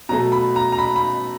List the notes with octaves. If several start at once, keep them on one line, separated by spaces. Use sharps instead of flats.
B2 F#3 A3 A#5
B5
A#5
A#5
B5
B5